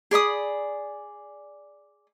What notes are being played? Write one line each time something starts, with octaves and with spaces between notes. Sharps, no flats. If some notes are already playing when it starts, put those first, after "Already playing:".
G#4 D5 B5 D#6